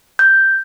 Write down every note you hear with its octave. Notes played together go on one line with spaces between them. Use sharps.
G6